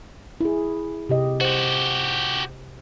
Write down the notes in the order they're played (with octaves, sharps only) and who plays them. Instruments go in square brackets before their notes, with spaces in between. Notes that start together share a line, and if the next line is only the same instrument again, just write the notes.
[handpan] E4 G#4
C3 G4 D#5
[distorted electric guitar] F#4 G4 [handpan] C5